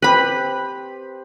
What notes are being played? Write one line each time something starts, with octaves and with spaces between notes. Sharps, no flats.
C4 G4 B4 B5